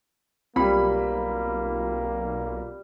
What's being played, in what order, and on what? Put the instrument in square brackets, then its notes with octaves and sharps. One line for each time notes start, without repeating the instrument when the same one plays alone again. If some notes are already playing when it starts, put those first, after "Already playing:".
[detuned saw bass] B1 [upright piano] G3 B5 [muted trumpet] A#3 [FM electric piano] C4 F4